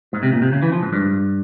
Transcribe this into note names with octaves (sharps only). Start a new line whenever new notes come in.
G#2
C3
A#2
C3
C#3
E3
F3
G#2
G2